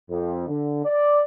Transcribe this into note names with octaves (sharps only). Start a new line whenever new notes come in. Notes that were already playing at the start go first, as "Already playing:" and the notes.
F2
D3
D5